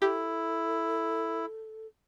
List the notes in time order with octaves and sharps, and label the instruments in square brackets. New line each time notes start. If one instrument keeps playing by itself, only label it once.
[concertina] E4 [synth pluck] G4 [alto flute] A4